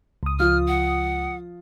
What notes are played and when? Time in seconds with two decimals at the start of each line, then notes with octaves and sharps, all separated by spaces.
0.23 C#2 D#6
0.39 F3 F4 F6
0.68 F#5